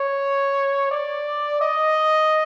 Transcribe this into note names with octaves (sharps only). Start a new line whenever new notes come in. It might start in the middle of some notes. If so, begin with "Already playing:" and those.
Already playing: C#5
D5
D#5